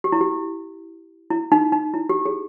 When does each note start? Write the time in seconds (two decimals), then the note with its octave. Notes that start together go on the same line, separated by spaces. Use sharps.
0.04 G4
0.12 E4
0.21 G4
1.30 E4
1.52 D#4
1.72 D#4
1.94 E4
2.09 G4
2.26 G#4